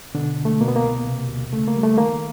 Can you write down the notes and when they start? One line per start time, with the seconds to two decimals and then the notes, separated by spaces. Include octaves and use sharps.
0.15 B2 D3 D4
0.38 C#2
0.45 A3
0.61 B2 A#3
0.68 B3
0.76 A#3
0.84 C2
1.06 C3
1.29 D2
1.52 C#3 A3
1.68 A#3
1.76 G3
1.83 A3
1.98 D#3 A#3